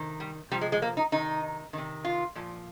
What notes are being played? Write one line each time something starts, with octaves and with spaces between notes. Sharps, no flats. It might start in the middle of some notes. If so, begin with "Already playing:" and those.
Already playing: C3 D#3
G3
C3 F3 G3
G#3
G#3
A#3
D#4
C3 D#3 D#4
C3 D#3
F4
A#2 F3